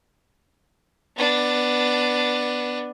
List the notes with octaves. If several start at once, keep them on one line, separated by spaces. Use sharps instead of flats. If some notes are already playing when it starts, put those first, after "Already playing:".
B3 D4